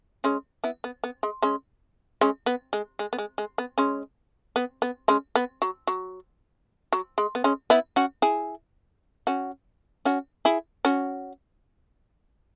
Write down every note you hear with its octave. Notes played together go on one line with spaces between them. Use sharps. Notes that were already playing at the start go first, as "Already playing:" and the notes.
G#3 C#4
B3 E4
B3
B3
G#3
G#3 C#4
G#3 C#4
B3
G#3
G#3
B3
G#3
G#3
B3
G#3 C#4
B3
B3
G#3 C#4
B3
F#3
F#3
F#3
G#3
B3
G#3 C#4
B3 E4
C#4 F#4
E4 G#4
C#4 F#4
C#4 F#4
E4 G#4
C#4 F#4